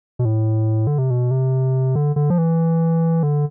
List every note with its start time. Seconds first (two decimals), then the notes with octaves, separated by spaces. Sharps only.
0.19 B2
0.25 A2
0.87 D3
0.98 C3
1.10 B2
1.31 C3
1.95 D3
2.16 D3
2.30 F3
2.38 E3
3.23 D3